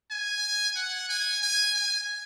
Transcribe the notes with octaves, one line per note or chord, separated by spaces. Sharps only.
G#5
F#5
G#5
G#5
G#5